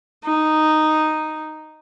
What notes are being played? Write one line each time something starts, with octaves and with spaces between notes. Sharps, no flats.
D#4